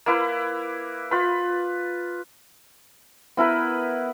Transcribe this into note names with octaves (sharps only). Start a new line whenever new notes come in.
A#3 E4 B4
F4 B4
B3 E4 A#4 B4